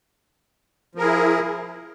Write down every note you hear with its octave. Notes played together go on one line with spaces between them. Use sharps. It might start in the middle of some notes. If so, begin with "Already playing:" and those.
F3 E4 G#4 A#4